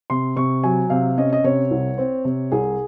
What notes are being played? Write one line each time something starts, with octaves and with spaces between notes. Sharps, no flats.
C3 C6
C3 C#6
F#3 G#5
C3 F5
C#4 D#5
D#5
C3 C#5
C2
C4
C3
C2 G#4